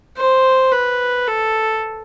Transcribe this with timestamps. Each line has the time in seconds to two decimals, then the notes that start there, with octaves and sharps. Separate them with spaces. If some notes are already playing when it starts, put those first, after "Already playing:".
0.17 C5
0.72 B4
1.27 A4